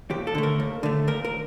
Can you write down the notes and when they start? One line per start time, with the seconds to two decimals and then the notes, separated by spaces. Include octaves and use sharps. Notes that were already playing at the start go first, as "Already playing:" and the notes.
0.10 D#2 G4
0.27 A4
0.35 D3 A3
0.43 A#4
0.60 D#2
0.83 D3 A3
1.08 D#2 A#4
1.25 A#4